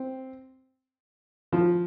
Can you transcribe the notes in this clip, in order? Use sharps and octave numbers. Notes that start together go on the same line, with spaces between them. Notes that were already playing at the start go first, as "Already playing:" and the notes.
Already playing: C4
F3